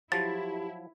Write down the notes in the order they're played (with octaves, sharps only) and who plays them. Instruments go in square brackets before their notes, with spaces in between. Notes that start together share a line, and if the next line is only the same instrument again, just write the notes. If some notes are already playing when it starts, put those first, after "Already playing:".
[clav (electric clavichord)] F3 F#3 [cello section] E4 [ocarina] G4 [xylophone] A6